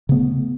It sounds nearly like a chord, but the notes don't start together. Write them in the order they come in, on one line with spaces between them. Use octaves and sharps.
C#3 B3 A3